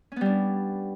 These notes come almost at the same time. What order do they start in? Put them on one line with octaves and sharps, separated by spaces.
C#4 B3 G3 D4